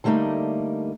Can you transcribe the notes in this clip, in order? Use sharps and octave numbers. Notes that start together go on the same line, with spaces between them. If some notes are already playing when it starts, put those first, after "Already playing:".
D3 G3 A3 A#3 D#4